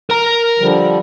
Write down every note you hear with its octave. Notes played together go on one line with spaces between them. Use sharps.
A#4 A#5
D3 F3 G3